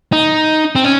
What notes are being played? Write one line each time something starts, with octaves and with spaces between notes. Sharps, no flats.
D#4
C4
C#4